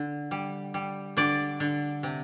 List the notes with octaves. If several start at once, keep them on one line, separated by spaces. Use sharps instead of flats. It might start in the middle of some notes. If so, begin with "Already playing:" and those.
Already playing: D3
G3
G3
D3 D5
D3
C3